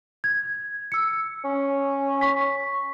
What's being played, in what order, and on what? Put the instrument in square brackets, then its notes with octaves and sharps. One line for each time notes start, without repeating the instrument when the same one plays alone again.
[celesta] G#6
E6 C#7
[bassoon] C#4
[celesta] C#6 B6